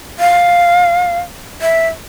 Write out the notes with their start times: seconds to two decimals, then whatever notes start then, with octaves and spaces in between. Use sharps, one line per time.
0.19 F5
1.62 E5